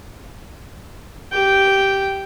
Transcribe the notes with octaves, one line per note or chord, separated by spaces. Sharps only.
G4 G5